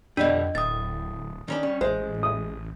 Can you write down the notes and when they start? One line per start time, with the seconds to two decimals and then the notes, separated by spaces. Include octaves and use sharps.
0.17 F2 B2 D3 G3 D4 D#5
0.55 D1 A2 D#6 A6
1.48 D#3 C#4 D4
1.63 G3 C#4
1.81 A1 G#3 C5
2.23 D#6